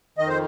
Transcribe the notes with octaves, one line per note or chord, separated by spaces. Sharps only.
F2 D#3 D#5
C5